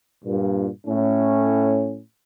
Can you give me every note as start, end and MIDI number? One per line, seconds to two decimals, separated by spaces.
0.25 0.68 43
0.25 0.68 46
0.86 1.99 45
0.86 1.99 61